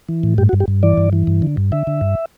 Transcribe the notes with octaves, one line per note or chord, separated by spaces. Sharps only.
E3
A2
G2 G4
F#4
G2
G4
G2
E3 D5
G2
E3
G2
D3
G2
D3 E5
D3
G2